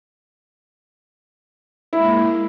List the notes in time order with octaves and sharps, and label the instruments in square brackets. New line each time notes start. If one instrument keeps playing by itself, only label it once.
[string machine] G#3 A#3 [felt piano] E4